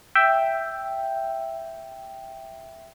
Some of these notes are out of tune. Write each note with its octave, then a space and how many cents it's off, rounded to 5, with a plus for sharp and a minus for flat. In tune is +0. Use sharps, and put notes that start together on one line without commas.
E5 +5 G5 +0